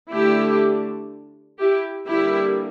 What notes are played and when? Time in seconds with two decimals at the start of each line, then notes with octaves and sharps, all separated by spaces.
0.12 D3 A3 D4 E4 G4
1.59 E4 G4
2.08 D3 G3 A#3 E4 G4